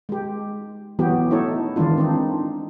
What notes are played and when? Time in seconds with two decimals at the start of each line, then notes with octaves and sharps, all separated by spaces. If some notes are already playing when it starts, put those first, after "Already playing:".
0.09 G#3 G4
0.99 E3 F#3 B3 F#4 G4
1.31 A3 D#4 E4 A4 C#5
1.76 D#3 E3 G#3 D4 F4
1.98 C4 D4 D#4